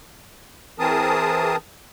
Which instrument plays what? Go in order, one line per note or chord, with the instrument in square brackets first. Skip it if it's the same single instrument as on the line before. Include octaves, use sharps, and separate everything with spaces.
[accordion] E3 C4 G#4 A#4 A5 D#6